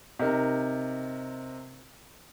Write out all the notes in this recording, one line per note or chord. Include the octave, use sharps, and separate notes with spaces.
C3 D#4 A#4